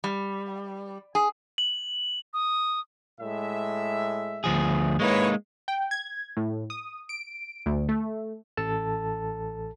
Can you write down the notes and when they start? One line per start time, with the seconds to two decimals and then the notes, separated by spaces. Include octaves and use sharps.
0.04 G3
1.15 G#4
1.58 F#7
2.34 D#6
3.21 A2 G#3 E5
4.44 D2 F3 G#4
5.00 G#3 A#3 D#4 E4 B4 C#5
5.68 G5
5.91 G#6
6.37 A2
6.70 D#6
7.09 D7
7.66 D2
7.89 A3
8.57 A1 A4 A5